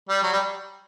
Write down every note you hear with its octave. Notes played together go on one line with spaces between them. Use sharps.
G3
F#3
G3